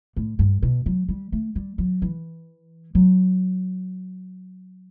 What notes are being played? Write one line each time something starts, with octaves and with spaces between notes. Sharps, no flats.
A2
G2
B2
F#3
G3
A3
G3
F#3
E3
F#3